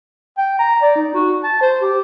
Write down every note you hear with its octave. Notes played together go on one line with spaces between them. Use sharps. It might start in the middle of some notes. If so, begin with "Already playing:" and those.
G5
A#5
D5
D#4
F#4
A5
C5
G4